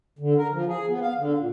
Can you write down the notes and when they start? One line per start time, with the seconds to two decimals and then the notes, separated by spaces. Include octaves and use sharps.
0.19 D3
0.38 A#4
0.52 F3
0.68 G#4
0.89 B3
1.02 F5
1.18 D3
1.38 A#2